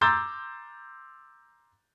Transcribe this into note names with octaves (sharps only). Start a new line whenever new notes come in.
A#5 C6 D6 E6 G6 A6